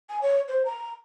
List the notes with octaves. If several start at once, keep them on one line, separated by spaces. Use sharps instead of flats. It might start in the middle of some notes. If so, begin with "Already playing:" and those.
G#5
C#5
C5
A#5